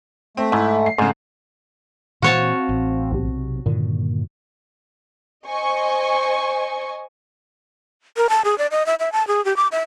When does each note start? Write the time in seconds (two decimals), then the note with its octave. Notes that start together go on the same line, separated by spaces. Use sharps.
0.37 A3 C4
0.52 G#2 E4
0.86 C7
0.98 G#2 C#3 A3
2.22 A#2 E3 C4 F#4 C#5 F5 A5
2.69 A1
3.12 B1 C3
3.66 G2 A#2 D3 D#3
5.48 C5 D#5 G#5 C#6
8.17 A#4
8.30 A5
8.45 G#4
8.58 D5
8.71 D#5
8.86 E5
8.99 E5
9.13 A5
9.28 G#4
9.45 G4
9.57 D6
9.72 E5